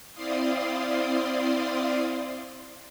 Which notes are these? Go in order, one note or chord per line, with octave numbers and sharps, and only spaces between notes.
C4 E4 D5 F5 C6 D#6